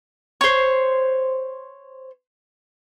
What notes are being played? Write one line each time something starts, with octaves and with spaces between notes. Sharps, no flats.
C5 C#5